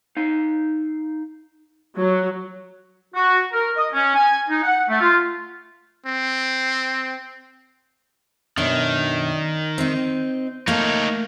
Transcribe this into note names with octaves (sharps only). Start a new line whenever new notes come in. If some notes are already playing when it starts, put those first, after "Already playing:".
D#4 F5
F#3
F#4
A#4
D#5
C#4
G#5
D#4
F#5
A3
F4
C4
F#2 B2 D#3 D4
C4 D#4
A3 A#3 D#4 C#5